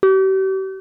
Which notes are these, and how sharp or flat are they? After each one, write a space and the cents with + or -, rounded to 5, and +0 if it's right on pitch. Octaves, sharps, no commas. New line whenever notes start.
G4 -40